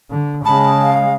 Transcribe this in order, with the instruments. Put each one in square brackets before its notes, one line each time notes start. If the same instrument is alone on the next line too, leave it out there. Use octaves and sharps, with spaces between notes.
[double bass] D3
[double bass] C#3 G#3 [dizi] A5 [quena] B5
[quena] F5